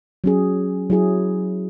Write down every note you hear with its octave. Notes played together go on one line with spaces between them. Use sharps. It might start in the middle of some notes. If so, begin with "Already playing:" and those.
F#3 C#4 G#4
F#3 E4 G#4